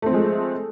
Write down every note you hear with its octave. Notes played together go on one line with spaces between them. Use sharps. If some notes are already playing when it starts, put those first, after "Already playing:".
F3 G#3 A3 C4